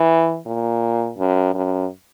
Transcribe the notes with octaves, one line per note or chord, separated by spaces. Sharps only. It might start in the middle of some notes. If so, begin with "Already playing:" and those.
Already playing: E3
A#2
F#2
F#2